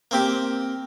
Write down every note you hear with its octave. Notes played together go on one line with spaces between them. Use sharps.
A#3 C4 G4